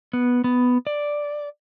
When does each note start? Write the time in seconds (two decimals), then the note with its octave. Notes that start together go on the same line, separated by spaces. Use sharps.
0.13 B3
0.44 B3
0.87 D5